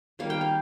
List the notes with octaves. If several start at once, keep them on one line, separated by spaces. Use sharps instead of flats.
D#3 G3 A#3 F5
G5
F5